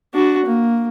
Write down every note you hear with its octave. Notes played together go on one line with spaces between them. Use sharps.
D4 F#4
A#3